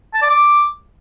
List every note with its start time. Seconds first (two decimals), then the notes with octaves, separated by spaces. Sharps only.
0.14 A5
0.22 D5
0.30 D6